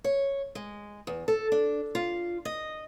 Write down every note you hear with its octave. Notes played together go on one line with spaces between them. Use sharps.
C#5
G#3
E2
A4
D4
F4
D#5